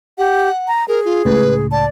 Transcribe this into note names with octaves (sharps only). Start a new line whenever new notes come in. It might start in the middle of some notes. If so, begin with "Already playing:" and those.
G4 F#5
A#5
G#4 A#4
F4
C#2 A2 B4
D5 A5